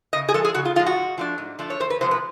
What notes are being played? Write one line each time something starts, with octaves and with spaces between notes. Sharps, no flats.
C#3 D#5
G#4
F3 G#3 A4
G#4
C#3 F#4
F4
F3 G#3 F4
F#4
G#2
F3 A3 D4
G#2
F3 A3 D4
C#5
E2 C5
B4
C3 F3 G#3 B3 C5
B4